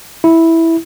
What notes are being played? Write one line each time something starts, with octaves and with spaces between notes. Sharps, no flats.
E4